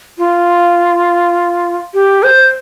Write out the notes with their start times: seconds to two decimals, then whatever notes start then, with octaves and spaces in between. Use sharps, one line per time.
0.18 F4
1.94 G4
2.23 C5